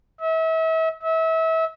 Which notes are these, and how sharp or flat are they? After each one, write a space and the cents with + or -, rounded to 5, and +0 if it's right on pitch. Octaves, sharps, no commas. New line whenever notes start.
E5 -35
E5 -30